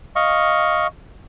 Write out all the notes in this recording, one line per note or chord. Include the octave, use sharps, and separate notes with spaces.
D#5 F5 C#6